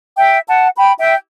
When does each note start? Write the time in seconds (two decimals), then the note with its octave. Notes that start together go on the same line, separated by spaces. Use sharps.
0.18 E5 G5
0.47 F#5 A5
0.76 G5 B5
0.99 E5 G5